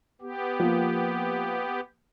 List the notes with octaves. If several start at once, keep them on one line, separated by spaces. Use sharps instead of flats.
B3 G4
F3 A#3